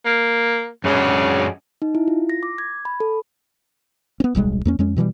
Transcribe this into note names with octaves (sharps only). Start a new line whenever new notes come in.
A#3
F#2 C#3 G#3 D4
D#4
E4
F4
A#6
D6
G#6
B5
A4
B3 C#4
D1 B1 G3 G#3
E2 A#3 C#4
F2 G#3 C#4
B2 E3 F3 G3